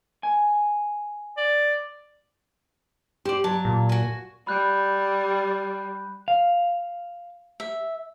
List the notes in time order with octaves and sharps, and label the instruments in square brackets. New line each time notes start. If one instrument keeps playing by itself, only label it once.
[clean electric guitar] G#5
[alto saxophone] D5
[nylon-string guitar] G4 [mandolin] C5 D5
[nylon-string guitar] F#3 [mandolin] A5
[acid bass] A#2
[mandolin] F#4 G#5
[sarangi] G3 [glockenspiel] B5 F#6 G6
[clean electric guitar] F5
[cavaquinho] E5